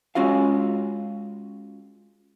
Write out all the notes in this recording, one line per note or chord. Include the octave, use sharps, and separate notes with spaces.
G#3 C#4 F4 F#4 F5